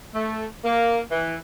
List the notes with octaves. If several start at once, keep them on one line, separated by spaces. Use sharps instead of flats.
A3
A#3
E3